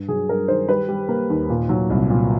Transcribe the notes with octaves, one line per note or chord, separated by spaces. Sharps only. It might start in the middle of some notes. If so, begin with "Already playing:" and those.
Already playing: G2
F#3 G#4
G2 A#4
D#3 C5
G3 B4
G3
A#3
D#2
A#2
F#3
C2
A#2